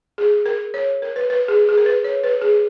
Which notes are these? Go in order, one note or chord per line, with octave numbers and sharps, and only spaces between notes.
G#4
A#4
C#5
A#4
B4
B4
G#4
G#4
A#4
B4
C#5
B4
G#4